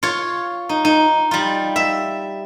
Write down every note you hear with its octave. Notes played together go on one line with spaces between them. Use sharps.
F4 C#5
D#4
D#4
G3 F4
E5